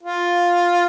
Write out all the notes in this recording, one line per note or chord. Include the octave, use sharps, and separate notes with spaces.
F4